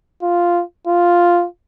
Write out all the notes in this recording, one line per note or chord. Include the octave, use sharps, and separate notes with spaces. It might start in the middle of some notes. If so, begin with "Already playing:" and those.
F4
F4